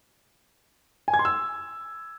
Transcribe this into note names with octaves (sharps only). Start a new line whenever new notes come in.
G#5
G#6
C6
E6